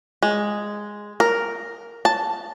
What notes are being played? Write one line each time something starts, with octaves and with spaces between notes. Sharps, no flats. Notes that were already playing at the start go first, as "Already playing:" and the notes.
G#3
A#4
A5